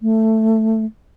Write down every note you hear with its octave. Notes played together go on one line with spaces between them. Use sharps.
A3